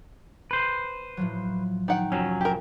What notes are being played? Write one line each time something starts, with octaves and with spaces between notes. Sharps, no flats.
B4 C5
A2 F3 F#3
D#3 F#5 G5
F1 F2 F#3 C#4 C7
G4 A#4